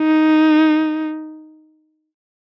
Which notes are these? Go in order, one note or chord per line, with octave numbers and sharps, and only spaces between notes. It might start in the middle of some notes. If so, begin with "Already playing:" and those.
Already playing: D#4